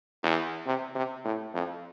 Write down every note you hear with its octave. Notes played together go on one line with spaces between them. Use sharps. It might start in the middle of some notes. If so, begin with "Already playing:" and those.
E2
C3
C3
A2
F2